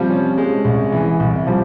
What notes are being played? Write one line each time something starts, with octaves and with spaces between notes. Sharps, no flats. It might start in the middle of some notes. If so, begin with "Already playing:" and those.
Already playing: C3 F3 G3
C#4
G#3
C2
E3
C2
F3 G3